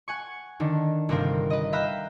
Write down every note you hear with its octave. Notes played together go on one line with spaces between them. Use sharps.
F#5 G#5 C#6
D3 D#3 D4
G1 C3 C4 A#4 F5
B4 D#5
E5 F5 G5 A#5 B5 F#6